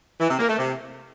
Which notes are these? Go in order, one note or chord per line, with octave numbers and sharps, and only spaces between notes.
E3
C3
A#3
A3
C3